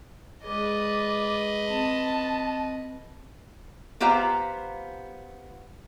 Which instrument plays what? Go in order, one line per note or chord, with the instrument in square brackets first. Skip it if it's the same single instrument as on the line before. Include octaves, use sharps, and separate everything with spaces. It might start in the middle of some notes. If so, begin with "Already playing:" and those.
[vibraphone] G#3 G#4 [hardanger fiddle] B4 D#5 [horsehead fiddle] D5
[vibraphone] C4 [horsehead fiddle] A5
[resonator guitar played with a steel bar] B3 F4 G4 C5 F5 A#5